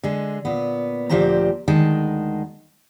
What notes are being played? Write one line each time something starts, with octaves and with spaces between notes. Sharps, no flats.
D3 G#3
A#2 B3
D2 A#2 F3 G4 C5 A#5
D2 D#3 G#3 A5